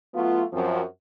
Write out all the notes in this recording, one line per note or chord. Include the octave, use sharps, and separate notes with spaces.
F#3 A3 B3 F4
F#2 F3 C4